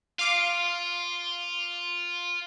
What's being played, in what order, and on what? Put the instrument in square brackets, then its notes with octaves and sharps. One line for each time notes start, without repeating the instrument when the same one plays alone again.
[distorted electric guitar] F4 [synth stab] F5 D6